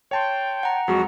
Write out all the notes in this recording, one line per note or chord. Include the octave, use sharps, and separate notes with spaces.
C#5 G5 A5 C6
F#5 A#5
F2 F#3 G#3 F#4